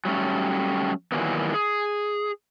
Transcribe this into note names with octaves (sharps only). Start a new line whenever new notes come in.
F#3 G3 A3 C#4
D#3 E3 F#3 G3 A#3 B3
G#4